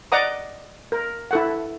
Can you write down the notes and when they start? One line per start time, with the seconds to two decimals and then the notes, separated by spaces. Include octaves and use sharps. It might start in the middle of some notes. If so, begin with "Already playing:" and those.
0.12 D5 D#5 F#5 A#5 D6 D#6
0.92 A#4
1.31 E4 A4 F#5